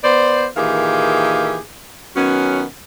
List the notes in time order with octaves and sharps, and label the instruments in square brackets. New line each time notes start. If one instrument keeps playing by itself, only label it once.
[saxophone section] B3 C5 D5
A#2 D#3 E3 G4 G#4 F5
D#3 F#3 B3 C#4